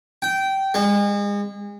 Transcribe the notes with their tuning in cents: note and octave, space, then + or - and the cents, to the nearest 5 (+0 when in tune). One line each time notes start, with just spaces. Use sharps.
G5 -15
G#3 -35